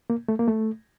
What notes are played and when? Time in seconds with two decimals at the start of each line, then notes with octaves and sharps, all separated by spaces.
0.10 A#3
0.28 A3
0.39 A#3
0.47 A3